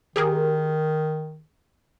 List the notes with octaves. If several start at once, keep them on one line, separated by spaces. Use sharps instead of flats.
D#3 G4 G#4 A#4